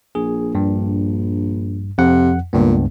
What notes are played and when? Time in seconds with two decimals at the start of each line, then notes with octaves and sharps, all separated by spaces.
0.15 A#1 G#4
0.55 G2
1.98 F2 C3 F#5
2.53 C#2 G2 A#2 B3